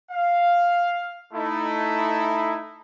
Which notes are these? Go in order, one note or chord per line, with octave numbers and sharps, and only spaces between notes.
F5
A3 D#4 E4